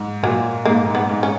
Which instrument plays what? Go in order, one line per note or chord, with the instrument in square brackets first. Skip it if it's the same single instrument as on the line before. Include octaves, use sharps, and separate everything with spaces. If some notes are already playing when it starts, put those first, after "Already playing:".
Already playing: [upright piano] G#2
[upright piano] A#2 [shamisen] F#3
[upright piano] G#2 [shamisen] A#3
[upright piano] G#2
[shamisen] B3
[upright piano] G#2
[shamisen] C#4